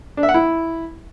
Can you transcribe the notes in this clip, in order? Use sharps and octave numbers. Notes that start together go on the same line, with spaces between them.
D4
E5
F#5
E4